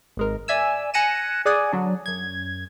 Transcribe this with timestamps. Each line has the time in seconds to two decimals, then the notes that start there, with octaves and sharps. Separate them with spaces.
0.17 G#1 G#3 A#4
0.48 D5 E5 G#5 E6
0.94 G#5 F#6 A#6 C#7 D#7 E7
1.45 G#4 D5 F#5 G#5 D#6
1.72 D3 F#3 D4
2.06 F#2 G#6